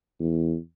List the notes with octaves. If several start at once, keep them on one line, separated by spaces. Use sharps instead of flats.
E2